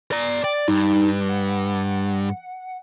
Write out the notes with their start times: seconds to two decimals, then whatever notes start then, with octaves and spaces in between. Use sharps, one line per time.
0.12 D5 A#5
0.44 D5 G5
0.68 G2 D#4
1.29 F#5